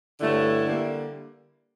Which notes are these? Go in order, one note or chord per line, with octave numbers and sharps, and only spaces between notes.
G2 D3 F#3 A3 E4
D3 G3 A#3